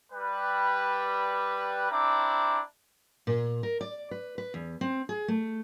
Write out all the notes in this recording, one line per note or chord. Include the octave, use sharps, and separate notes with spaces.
G3 B4
C4 D4 E4 A#5 D6
A#2
A#4
D5
B4
B4
E2
C4
G#4
A3